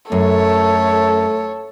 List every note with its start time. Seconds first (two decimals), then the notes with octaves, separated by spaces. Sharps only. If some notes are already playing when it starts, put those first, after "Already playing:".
0.12 F#2 A3 A4 C#5